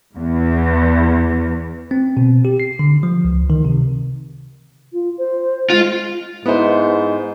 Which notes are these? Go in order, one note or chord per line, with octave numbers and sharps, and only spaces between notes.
E2
C4
B2
G4
C7
D3
F3
C#2
D#3
C3
F4
C5
G#3 F4
G#2 B3 E4 C5